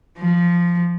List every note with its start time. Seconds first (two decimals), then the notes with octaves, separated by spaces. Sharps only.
0.18 F3